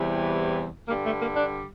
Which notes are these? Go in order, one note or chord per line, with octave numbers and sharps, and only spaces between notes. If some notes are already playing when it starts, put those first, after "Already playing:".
Already playing: E2 C3 E3 G3
G2 D3 G3 A#3
A3
A#3
D4